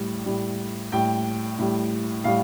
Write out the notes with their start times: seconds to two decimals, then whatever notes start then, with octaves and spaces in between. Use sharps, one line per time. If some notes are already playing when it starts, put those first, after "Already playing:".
Already playing: A2 G3
0.26 A2 G3
0.92 A2 G3 G5
1.59 A2 G3
2.24 A2 G3 F5